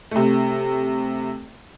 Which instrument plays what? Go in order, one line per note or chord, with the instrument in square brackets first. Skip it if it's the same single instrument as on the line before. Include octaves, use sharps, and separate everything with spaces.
[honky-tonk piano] C3 A3